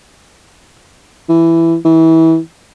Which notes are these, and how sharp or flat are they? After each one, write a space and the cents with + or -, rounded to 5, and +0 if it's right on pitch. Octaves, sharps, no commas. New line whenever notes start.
E3 +10
E3 -25